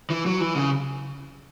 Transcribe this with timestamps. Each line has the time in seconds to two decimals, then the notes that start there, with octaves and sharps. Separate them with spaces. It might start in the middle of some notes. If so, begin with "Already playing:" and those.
0.10 E3
0.26 F#3
0.41 E3
0.55 C#3